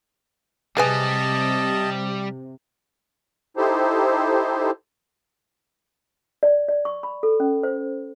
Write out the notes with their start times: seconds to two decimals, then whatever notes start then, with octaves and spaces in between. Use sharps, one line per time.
0.77 C3 G3 G#4 B4 D#5 G#5 A5
3.57 D#4 E4 G4 A4 C5
6.43 D5
6.68 D5
6.85 C#6
7.03 B5
7.23 A4
7.40 C#4
7.63 C5